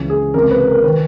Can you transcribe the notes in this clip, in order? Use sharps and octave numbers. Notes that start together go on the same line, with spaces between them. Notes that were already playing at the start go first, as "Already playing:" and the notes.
Already playing: C#2 C#3 E3
G#4
C#2 C3 E3 A#4
B4
A#4
D#3 B4